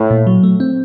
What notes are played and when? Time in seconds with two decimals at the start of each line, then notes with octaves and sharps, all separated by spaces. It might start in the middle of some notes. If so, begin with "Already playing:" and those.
Already playing: A2
0.11 A#2
0.27 F#3
0.43 A3
0.60 C4